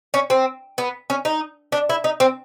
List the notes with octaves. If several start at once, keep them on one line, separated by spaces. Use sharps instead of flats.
C#4
C4
B3
C#4
D#4
D4
E4
D#4
C4